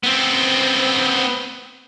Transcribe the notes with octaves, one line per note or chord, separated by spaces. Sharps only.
B3 C4